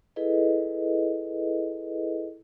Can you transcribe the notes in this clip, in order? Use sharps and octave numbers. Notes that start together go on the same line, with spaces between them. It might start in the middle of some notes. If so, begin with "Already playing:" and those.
E4 G#4 A4 B4 D#5